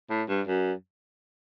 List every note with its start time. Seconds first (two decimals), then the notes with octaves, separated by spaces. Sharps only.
0.10 A2
0.29 G2
0.47 F#2